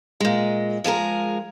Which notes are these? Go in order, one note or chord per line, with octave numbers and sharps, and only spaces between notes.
A#2 G#3
F3 G#3 G#4 A#4